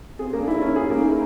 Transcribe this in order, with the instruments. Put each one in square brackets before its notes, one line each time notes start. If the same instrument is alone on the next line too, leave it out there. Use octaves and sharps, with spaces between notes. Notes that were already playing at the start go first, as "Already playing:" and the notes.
[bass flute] C4 [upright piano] G#4
[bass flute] C#4
[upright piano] A#3
[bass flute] D4
[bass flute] D#4 [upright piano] E4
[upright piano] C#4 [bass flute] D#4
[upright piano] G#4
[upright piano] A#3 [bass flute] D#4
[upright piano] E4